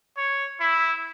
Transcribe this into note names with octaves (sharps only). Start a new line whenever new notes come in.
C#5
E4